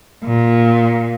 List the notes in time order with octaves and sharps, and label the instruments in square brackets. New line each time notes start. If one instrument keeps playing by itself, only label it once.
[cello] A#2